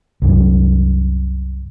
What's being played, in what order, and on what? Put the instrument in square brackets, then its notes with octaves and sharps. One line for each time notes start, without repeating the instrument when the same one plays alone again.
[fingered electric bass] C2 F#2